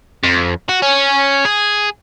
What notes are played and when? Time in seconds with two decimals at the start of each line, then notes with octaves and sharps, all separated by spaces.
0.23 F2
0.69 F#4
0.82 C#4
1.45 G#4